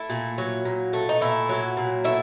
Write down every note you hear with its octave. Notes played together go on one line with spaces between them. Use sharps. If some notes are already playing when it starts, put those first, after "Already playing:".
Already playing: A3 E4
A#2
F#3
A#2
A3
D#4
A#2 E4
F#3
A#2
A3 E4